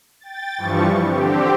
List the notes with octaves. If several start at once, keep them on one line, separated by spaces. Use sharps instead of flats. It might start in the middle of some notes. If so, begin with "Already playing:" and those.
G5 A6
G2 E3 F3 G3 C#6
D3 C4 G4